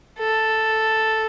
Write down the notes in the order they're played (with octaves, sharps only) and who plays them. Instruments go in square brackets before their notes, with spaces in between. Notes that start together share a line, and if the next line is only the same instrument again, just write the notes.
[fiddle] A4